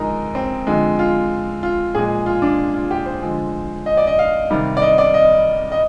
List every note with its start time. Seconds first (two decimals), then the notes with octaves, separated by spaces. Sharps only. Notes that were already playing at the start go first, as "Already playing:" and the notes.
Already playing: D3 F3 G#3 D#4 A#4
0.35 C4
0.67 D3 F3 G#3
0.99 F4
1.63 F4
1.95 A#2 F3 G#3 G#4
2.26 F4
2.42 D4
2.74 F4
2.91 G4
3.06 C5
3.23 D3 F3 G#3
3.86 D#5
3.97 D5
4.07 D#5
4.19 F5
4.50 C3 D#3 G3
4.77 D5
4.82 D#5
4.98 D5
5.14 D#5
5.72 D#5